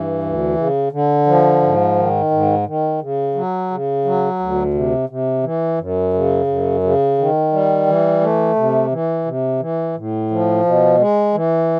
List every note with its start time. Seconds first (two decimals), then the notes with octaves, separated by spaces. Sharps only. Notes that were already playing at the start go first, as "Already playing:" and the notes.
Already playing: G2 E3
0.23 D2
0.57 C#3
0.92 D3
1.26 F3
1.62 G#2
1.96 D#3
2.31 G#2
2.66 D#3
3.01 C#3
3.35 F#3
3.71 C#3
4.05 F#3
4.39 D2
4.74 C3
5.09 C3
5.43 E3
5.79 F#2
6.14 C#3
6.47 F#2
6.83 C#3
7.18 D#3
7.53 G3
7.86 E3
8.21 A3
8.56 C3
8.91 E3
9.25 C3
9.60 E3
9.96 A2
10.31 F3
10.65 B2
10.99 G#3
11.34 E3